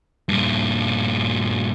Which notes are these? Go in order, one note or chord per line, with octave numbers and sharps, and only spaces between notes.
G2 A#2